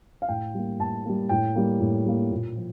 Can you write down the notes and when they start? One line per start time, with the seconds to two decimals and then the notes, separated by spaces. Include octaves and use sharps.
0.22 F5
0.29 A2 G5
0.54 G3 A#3
0.79 A2 A5
1.05 G3 A#3
1.29 A2 G5
1.56 G3 A#3
1.80 A2
2.05 G3 A#3
2.31 A#2
2.57 F3